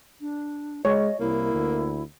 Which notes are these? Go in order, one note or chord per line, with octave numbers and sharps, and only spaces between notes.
D4
G#3 C#5 D#5
C2 A#3 E4
D2